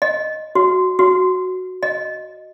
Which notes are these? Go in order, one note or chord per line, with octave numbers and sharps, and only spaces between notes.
D#5
F#4
F#4
D#5